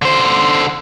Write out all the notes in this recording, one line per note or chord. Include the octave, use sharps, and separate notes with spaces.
D3 C5